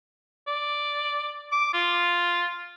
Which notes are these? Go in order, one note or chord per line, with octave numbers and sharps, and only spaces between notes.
D5
D6
F4